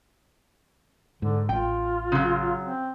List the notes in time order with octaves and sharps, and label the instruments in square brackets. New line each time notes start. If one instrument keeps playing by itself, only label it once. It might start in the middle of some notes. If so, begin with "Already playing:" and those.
[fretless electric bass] G#2 [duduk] D3
[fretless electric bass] A1 [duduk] F4 [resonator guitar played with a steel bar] G5
[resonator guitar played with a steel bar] C#3 F#3
[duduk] C4